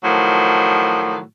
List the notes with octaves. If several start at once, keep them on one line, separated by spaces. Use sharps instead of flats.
A2 D#3 F3 F#3